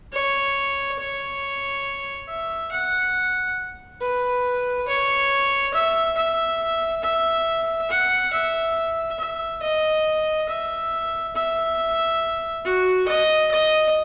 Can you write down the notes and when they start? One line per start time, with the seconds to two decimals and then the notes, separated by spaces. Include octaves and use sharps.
0.13 C#5
0.99 C#5
2.29 E5
2.72 F#5
4.02 B4
4.88 C#5
5.74 E5
6.17 E5
7.03 E5
7.90 F#5
8.33 E5
9.19 E5
9.62 D#5
10.49 E5
11.35 E5
12.64 F#4
13.08 D#5
13.51 D#5